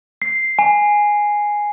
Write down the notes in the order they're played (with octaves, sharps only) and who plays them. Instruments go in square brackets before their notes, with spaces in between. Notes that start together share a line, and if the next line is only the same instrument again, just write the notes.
[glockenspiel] C7
G#5